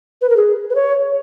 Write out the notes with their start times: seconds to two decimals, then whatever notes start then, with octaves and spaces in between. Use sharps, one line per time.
0.22 B4
0.30 A#4
0.36 G#4
0.70 B4
0.75 C#5